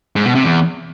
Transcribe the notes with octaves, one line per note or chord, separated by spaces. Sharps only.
G#2
B2
C3
E2